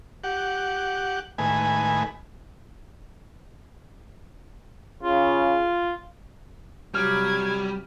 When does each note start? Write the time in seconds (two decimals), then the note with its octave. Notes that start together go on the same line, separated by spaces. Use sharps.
0.24 G4 F#5
1.38 A2 D#3 G#3 B4 G#5
5.03 C#3 F4
6.94 C3 F#3 G3 F6 G#6